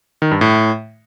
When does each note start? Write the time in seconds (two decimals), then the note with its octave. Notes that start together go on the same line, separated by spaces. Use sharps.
0.22 D#3
0.31 G2
0.41 A2